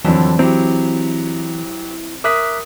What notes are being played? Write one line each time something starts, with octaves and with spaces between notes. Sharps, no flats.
F2 D3 E3 F#3 C4
F#3 C4 E4 G4
A#4 E5 D6 D#6 F#6 B6